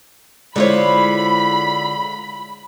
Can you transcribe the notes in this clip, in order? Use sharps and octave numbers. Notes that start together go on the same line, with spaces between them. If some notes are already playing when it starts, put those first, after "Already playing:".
D3 G#3 E4 F4 C5 C#5 B5